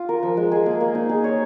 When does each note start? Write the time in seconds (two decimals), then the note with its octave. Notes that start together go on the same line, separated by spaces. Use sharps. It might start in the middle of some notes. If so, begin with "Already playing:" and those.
Already playing: F4
0.09 A#4
0.23 F3
0.37 G#3
0.52 G#4
0.66 A#3
0.81 A#3
0.95 D#4
1.09 G#4
1.24 C#5